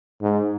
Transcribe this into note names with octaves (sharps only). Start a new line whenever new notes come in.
G#2